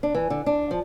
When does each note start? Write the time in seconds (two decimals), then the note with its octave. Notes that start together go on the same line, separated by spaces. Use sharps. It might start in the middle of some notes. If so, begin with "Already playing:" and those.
0.03 D4
0.15 E3
0.30 D3
0.46 D4
0.71 F3